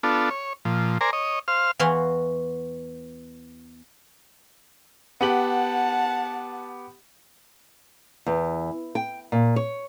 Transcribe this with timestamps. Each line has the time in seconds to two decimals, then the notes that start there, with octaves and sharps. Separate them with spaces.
0.03 B3 D4 F4 A4
0.30 C#5
0.65 A#2 F3
1.01 A#4 C5 D5 G#5 A#5
1.13 C#5 D#5
1.48 C5 F5 F6
1.79 E2 E3 F#4 F5 C6
5.21 B3 G4 F#5 A5 F#7
8.26 E2
8.95 G5
9.32 A#2
9.56 C#5